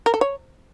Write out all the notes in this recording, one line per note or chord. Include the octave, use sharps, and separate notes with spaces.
A#4
A4
C#5